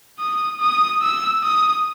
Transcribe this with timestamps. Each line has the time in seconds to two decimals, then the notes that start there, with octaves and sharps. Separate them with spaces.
0.20 D#6
0.60 D#6
1.02 E6
1.43 D#6